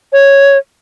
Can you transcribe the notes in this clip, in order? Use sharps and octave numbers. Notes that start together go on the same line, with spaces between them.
C#5